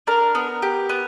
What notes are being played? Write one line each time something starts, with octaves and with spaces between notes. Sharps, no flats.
D4 A#4
B3
G4
B3